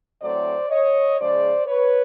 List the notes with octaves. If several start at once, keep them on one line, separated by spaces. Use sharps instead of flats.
A2 F#3 A3 C4 C5 D5
C#5 D#5
C#3 F3 G#3 C5 D5
B4 C#5